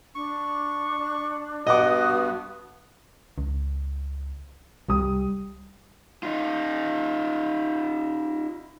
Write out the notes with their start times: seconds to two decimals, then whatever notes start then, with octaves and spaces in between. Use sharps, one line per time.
0.15 D4 C#6
1.67 G2 B3 F#4 D#5 F#5 D6 D#6
3.38 C#2
4.89 C2 G3 D#6
6.23 D#4 F4